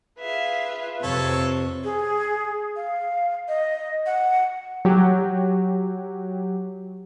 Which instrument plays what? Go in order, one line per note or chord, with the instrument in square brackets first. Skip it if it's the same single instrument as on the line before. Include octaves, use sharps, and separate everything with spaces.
[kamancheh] F4 B4 [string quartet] G#4 E5 F5
[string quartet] F2 [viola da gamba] C3 [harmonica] A4 C#5
[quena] G#4
F5
D#5
F#5
[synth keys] F#3 G4